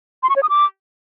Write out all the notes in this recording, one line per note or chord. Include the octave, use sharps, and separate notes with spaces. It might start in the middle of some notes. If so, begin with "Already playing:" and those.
C6
C#6
C#5
D#6
D6